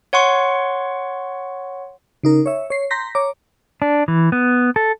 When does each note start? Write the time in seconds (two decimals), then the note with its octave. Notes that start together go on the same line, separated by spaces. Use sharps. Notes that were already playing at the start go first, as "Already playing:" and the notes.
0.13 C#5 F#5 C6 C#6
2.24 C#3 D#4 A#4
2.46 C#5 E5
2.70 C#5 C7
2.91 A#5 C6 G6 A#6 B6
3.15 C#5 A#5 D6
3.82 D4
4.08 E3
4.32 B3
4.76 A4